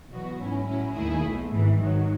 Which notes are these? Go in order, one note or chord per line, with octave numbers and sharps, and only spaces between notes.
E2 B2 F#3 B3 F#4
G#2 F#3 C#4 E4
A2 F#3 C#4 E4
D#2 D#3 A3 E4 G#4
B1 B2 A3
G#1 G#2 E3
G#1 G#2 D#3 F#3